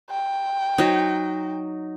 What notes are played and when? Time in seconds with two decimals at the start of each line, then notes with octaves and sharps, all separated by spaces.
0.11 G5
0.78 F#3 D#4